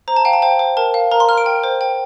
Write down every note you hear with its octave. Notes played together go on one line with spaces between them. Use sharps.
C5 A#5
A5
F5 G5
A5
C5 G5
C5
A#4 A5
F5
A#4 A#5
C6
A#4 F6
D7
G5
C5
G5